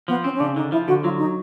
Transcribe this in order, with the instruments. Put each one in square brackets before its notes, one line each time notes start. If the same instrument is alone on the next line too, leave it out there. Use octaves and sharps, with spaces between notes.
[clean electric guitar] F3 [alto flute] B3
[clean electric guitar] C4 [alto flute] C#4
[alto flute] C#4
[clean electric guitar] C#3 [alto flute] D4
[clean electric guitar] D3 [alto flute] D#4
[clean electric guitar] F3 [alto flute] E4
[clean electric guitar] D3 [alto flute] F#4
[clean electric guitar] F#3 [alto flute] F4
[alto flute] D#4